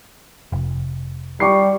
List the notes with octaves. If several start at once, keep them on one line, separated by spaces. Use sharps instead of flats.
F1
G3 C#6 D6 C7